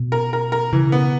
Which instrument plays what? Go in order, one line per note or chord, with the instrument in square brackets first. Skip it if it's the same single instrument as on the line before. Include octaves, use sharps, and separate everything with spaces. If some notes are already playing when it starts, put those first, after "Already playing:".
Already playing: [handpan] B2
[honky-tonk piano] A#4
A#4
A#4
[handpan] C#3 [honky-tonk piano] E3
[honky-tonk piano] B3